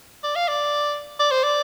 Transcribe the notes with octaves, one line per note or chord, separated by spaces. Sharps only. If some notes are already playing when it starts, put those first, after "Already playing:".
D5
F5
D5
D5
C5
D5